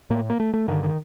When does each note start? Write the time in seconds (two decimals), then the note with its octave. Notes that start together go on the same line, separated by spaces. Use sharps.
0.10 A2 A#3
0.30 A#3
0.40 A3
0.54 A3
0.68 G2 D3 D#3
0.83 D#3